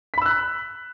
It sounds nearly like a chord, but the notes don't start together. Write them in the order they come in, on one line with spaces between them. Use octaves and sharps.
B6 B5 E6 F#6